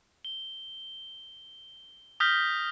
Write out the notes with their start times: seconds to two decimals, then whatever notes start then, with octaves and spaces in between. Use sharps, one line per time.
0.25 G7
2.20 D#6 F6 G6 A#6 B6 G7